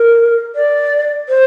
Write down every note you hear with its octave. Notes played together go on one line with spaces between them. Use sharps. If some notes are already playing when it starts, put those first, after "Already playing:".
Already playing: A#4
D5
C5